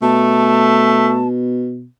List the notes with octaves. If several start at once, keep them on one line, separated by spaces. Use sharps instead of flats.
B2 A3 A5